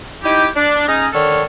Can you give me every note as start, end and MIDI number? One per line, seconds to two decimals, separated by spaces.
0.24 0.47 63
0.24 0.47 64
0.24 0.47 67
0.55 0.83 62
0.87 1.06 56
0.87 1.06 61
0.87 1.06 63
1.13 1.42 50
1.13 1.42 51
1.13 1.42 69
1.13 1.42 73
1.13 1.42 89